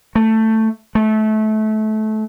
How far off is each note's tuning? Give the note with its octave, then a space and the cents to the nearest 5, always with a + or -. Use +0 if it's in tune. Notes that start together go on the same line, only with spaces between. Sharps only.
A3 +10
A3 -25